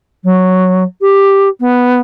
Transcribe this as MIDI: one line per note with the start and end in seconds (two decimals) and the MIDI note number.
0.24 0.84 54
1.01 1.49 67
1.60 2.01 59